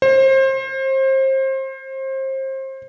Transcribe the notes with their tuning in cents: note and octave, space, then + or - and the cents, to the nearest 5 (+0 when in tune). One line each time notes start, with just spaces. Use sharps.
C5 +30